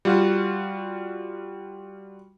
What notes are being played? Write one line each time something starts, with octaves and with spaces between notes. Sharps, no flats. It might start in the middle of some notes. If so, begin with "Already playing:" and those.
G3 F4 F#4